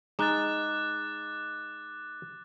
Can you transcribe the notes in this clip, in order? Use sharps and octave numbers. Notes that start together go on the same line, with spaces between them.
G#3 D#4 D6 F#6 A6